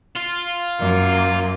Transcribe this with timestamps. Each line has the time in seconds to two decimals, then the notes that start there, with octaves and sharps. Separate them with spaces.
0.16 F4
0.79 F#2 A#3